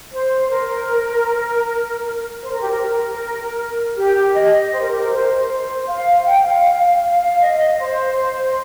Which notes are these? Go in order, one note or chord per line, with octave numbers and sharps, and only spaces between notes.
C5
A#4
C5
A#4
G4
A#4
G4
D#5
C5
A#4
G4
A#4
C5
C5
F5
G5
F5
F5
F5
F5
D#5
C5
C5